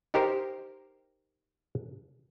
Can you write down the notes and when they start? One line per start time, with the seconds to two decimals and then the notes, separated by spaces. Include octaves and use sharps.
0.14 D#4 G4 A#4 C5